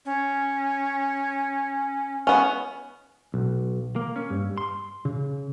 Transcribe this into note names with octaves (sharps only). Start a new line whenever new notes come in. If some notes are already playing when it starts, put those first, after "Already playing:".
C#4
B3 C#4
B1
A#3
C#4
G2
C6
C#3